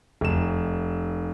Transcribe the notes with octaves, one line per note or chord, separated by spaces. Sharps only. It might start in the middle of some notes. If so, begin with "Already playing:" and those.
F1 E7